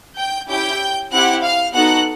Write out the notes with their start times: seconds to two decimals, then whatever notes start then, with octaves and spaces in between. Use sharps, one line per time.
0.18 G5 G6
0.49 C#4 E4 G4 G5 G6
1.12 C4 E4 G4 F#5 F#6
1.43 F5 F6
1.74 B3 D#4 F#4 A4 F#5 F#6